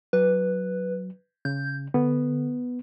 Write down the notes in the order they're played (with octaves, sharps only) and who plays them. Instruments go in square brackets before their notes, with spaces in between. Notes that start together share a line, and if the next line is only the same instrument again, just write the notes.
[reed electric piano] F#3 [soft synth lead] B4
[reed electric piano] C#3 [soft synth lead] G6
[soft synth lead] D3 [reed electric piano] B3